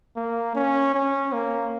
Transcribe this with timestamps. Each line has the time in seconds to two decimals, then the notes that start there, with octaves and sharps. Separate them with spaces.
0.17 A#3
0.55 C#4
0.95 C#4
1.33 A#3